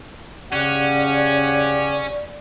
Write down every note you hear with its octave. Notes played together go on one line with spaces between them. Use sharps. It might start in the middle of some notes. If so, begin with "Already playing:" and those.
C#3 C#4 G4 D5 F#5